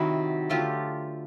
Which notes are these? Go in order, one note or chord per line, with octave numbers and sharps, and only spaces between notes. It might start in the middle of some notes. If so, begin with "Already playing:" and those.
Already playing: C3 D#3 F#3 E4 F#4
D3 F#3 A3 F4 G4